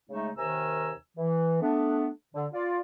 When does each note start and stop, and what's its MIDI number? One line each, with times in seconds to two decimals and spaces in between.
0.10 0.31 49
0.10 0.31 56
0.10 0.31 57
0.10 0.31 63
0.38 0.92 39
0.38 0.92 48
0.38 0.92 51
0.38 0.92 80
0.38 0.92 82
0.38 0.92 88
1.17 1.59 52
1.62 2.09 57
1.62 2.09 59
1.62 2.09 62
2.34 2.46 50
2.53 2.81 65
2.53 2.81 74